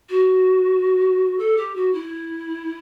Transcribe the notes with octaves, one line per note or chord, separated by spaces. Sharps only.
F#4
A4
G4
F#4
E4